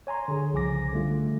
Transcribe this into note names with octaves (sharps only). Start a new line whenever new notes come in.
C#5 G#5 A#5 C6
D3 G#4
C2 C#3 F3 G#5 D6 A#6
D3 G3 A3 F4